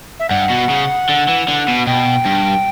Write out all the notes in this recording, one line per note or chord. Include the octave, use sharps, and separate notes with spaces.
E5
G2 F#5
B2
C#3
D3
E3
D3
B2
B2 G5
G2